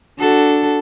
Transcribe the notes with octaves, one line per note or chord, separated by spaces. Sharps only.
D4 F#4 A4